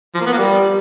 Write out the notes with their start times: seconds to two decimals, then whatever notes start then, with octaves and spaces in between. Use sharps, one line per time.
0.15 F3
0.21 A#3
0.27 B3
0.32 A#3
0.38 G3